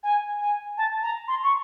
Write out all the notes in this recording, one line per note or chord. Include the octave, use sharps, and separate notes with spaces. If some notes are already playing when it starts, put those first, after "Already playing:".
G#5
G#5
A5
A#5
C6
C#6